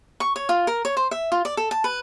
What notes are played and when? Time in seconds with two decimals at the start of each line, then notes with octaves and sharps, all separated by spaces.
0.20 C#6
0.36 C#5
0.49 F4
0.67 A#4
0.85 C#5
0.97 C5
1.11 E5
1.32 F4
1.45 D5
1.57 A4
1.71 A5
1.84 B4